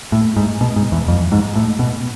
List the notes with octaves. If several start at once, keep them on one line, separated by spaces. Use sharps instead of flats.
A2
G#2
B2
G#2
E2
F2
G#2
A2
B2